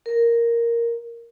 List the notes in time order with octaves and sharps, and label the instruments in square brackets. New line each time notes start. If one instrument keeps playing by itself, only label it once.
[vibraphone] A#4